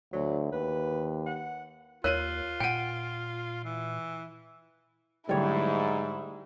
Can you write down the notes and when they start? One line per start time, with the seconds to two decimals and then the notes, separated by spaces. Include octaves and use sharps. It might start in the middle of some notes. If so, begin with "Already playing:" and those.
0.13 D2 F#3
0.53 D#2 B4
1.26 F#5
2.04 D#2 F4 A#4 C#5 F#6 D#7
2.60 A#2 F#5 G5 D7 D#7
3.64 E3
5.29 G#2 D3 F#3 G3 A3 E4 C#5